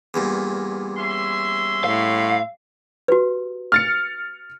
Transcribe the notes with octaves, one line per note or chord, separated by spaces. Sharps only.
E2 G2 A#2
C#4 E5 C6
A2 F5
F#4 G4 B4
F6 A6 C#7